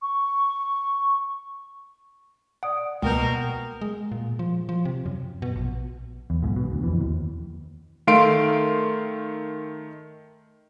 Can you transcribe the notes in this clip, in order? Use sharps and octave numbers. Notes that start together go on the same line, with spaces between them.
C#6
D5 F#5 D#6 D7
C#2 B2 A#3 A#4 G5 G6
G#3
A#2
F3
F3
C3
F#2
B2
A#1
E2
B1 E2 G#2
B2
D2
F2 E3
D#2
D#3 A3 F5 C6 D7